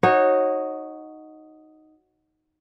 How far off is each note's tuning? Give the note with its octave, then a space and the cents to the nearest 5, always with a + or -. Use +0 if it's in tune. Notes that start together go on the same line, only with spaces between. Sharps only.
D#4 +0 F#4 +0 C#5 -25